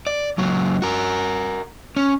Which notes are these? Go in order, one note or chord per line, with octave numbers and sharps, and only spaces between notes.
D5
C#2 F#3
F#4 A#4
C#4